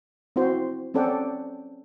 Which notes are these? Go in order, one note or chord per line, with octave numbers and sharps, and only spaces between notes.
C4 E4 F#4 C5
C4 C#4 A4 D5 F#5 G5